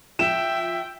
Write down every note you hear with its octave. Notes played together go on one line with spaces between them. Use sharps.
F3 E5 G5 E7